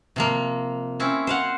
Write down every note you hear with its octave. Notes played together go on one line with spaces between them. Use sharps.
C3 F3 A#3
C4 C#4 E4
C5 F5 F#5